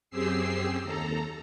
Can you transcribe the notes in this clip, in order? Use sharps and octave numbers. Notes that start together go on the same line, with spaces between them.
F#2 C4 G4 G#4 E6 C7
D#2 A4 A#5